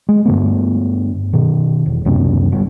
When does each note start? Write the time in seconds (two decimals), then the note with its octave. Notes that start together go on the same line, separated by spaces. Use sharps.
0.09 G#3
0.26 G2 D3 A3 B3
1.33 B2 D#3
1.86 E1
2.05 C#2 F#2 C3 A#3
2.52 G1 G2